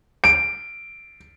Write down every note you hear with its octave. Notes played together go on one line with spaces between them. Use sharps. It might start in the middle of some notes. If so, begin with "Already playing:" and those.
D7